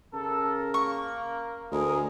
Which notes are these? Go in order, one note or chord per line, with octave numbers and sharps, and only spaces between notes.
C#3 A4 A#4
A#3 C#6
D2 G#4 A#4 D#5